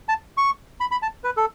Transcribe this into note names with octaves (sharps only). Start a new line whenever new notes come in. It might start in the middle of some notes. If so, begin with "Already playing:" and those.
A5
C#6
B5
B5
A5
B4
A4